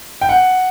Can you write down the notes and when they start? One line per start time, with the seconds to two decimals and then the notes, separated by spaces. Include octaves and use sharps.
0.21 G5
0.29 F#5